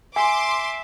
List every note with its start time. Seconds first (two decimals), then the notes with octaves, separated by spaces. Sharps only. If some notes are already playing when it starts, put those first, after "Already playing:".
0.16 E5 G#5 C6 D6